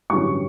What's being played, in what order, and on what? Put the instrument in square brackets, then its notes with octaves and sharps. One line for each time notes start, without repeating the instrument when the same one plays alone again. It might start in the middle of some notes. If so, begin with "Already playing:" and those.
[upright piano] A1 G2 D3 F#3 C#4 C#6